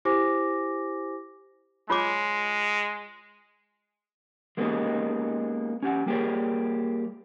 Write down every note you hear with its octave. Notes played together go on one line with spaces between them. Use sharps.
E4 G4 C5 G#5 D6 A#6
G#3 F4 C#5 D6
G#3 A#3 B3 C#4 D#4 G4
C#4 G4 F#5
G3 A#3 G4 G#4 C#5